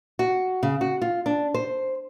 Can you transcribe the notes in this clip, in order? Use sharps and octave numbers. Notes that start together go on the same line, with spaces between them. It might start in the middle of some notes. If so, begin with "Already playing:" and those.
F#4
C#3
F#4
F4
D4
C5